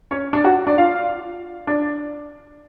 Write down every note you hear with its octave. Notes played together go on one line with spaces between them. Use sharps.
C#4 C#5
D4 D5
F#4 F#5
D4 D5
F4 F5
D4 D5